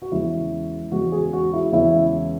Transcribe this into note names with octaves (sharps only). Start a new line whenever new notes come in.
F#4
E2 C#3 G#3 E4
E2 C#3 G#3 F#4
G#4
F#4
E4
E2 C#3 G#3 E4